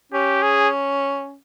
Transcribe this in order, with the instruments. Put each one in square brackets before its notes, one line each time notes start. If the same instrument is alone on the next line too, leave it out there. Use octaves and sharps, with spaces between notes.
[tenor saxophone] C#4 [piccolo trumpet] G4
[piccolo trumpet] G#4